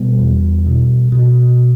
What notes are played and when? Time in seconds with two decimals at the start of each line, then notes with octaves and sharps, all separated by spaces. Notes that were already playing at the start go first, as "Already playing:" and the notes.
Already playing: B2 G3 B3
0.19 E2
0.66 B2
1.12 B2